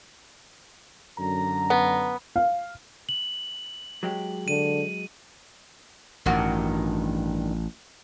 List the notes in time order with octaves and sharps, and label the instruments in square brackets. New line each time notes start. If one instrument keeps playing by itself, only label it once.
[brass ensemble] F#2 D3 A#5
[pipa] B3
[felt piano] F5
[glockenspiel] F#7
[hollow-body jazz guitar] F#3 G#3 G4
[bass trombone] D3 [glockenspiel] D#7
[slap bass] A1 [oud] G2 D#3 F#4